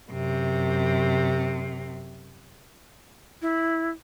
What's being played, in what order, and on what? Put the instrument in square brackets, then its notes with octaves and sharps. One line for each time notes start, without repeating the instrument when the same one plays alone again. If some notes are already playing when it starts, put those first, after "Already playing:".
[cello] F#2 C3
[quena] E4